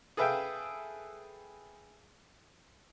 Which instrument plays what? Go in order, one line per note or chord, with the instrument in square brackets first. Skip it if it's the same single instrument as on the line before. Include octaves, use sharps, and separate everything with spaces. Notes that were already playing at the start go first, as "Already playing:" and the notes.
[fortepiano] G#4 A4 B4 E5 F5 G5